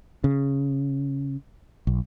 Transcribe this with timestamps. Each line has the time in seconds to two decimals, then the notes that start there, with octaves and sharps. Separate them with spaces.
0.24 C#3
1.87 B1